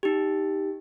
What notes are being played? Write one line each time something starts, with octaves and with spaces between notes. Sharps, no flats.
D#4 G4